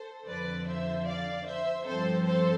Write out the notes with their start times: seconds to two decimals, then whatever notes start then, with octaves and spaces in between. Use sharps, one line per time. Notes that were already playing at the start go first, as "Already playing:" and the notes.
Already playing: A4 C5
0.27 F2 D3 F3 B4 D5
0.67 C5 E5
1.07 D5 F5
1.47 C5 E5
1.86 G2 F3 C4 A4 C5
2.26 A4 C5